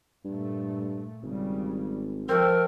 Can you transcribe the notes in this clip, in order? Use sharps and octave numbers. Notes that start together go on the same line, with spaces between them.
G2 A#2 A3
G#1 C#3 G3
F3 A3 C4 A#4